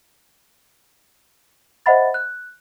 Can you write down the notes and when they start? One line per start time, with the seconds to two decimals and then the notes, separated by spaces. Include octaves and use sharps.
1.86 C5 D#5 E5 F#5 B5 A6
2.14 F#6